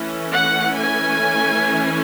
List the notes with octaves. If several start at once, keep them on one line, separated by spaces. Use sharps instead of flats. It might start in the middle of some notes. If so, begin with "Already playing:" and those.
Already playing: E3 A3 C#4
F#5
G#5